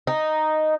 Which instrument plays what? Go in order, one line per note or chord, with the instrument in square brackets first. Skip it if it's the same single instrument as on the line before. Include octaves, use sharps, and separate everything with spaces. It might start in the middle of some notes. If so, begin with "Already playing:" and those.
[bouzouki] D#4